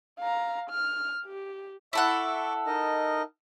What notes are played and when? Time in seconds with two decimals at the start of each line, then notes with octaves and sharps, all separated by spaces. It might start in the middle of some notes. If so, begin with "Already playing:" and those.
0.20 F5 A#5
0.70 F6
1.25 G4
1.93 E4 A4 E5 F#5 C#6 D6
2.67 D#4 A#4 D#5